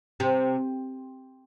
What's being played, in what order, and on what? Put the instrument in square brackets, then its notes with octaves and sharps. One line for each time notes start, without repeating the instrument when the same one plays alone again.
[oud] C3